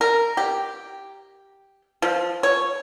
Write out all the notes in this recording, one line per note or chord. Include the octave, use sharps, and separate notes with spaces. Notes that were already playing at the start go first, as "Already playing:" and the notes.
A#4
G4
F3
C#5